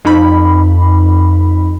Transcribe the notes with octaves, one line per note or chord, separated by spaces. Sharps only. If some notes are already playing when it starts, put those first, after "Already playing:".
F2 D#4 B5